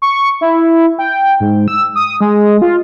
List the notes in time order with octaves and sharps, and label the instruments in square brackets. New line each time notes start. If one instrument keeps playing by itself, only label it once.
[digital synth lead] C#6
E4
G5
G#2
E6
D#6
G#3
F4